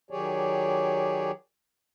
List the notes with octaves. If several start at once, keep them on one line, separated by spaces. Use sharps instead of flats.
D#3 F#3 G4 G#4 C#5 D5